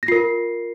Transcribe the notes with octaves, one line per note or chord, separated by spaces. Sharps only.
A#6
F4 A#4 C7